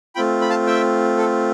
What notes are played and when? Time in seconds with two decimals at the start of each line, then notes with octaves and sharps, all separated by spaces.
0.15 A3 C4 F4 G5 B5
0.41 B5
0.50 F5 A5
0.66 E5 G5
1.18 A4